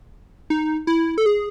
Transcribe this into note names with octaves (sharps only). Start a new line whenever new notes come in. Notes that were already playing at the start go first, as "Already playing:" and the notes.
D#4
E4
A4
G#4